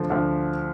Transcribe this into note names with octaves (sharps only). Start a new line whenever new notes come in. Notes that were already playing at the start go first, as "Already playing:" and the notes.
Already playing: D2 D3 F3
D2 D3 F3